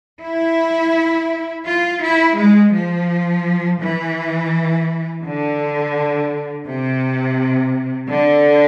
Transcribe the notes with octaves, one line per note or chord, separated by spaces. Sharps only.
E4
F4
E4
G#3
F3
E3
D3
C3
D3